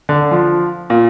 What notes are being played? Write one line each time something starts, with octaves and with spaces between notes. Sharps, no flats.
D3
F3
A#2